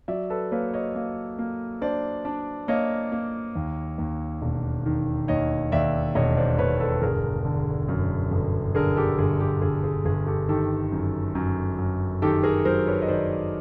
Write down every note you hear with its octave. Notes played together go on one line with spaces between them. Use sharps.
F#3 D5 E5
A4 B4
A#3 B4 C#5
C#5 D#5
A#3
A#3
D4 C5 D5
D4
A#3 C#5 D#5
A#3
D#2
D#2
E1
D#3
D#2 C#5 D#5
D#2 D5 E5
E1 C#5 D#5
C5 D5
E1 B4 C#5
A4 B4
G1 G#4 A#4
D3
F#2
G1
D3 G#4 A#4
G4 A4
G1 G#4
G4
G1 G#4
G#4
G1 G#4
G4 A4
D#3 G4 A4
F#2
F#2
F#2
D#3 G4 A4
G#4 A#4
F#3 A#4 C5
B4 C#5
D#5
D#3 C5 D5